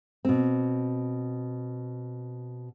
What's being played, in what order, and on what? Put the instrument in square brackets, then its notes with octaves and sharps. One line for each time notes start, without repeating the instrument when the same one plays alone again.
[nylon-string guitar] B2 C4